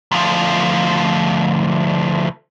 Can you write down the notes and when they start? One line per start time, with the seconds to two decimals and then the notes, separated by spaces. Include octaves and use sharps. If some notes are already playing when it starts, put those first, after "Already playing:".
0.12 D2 F3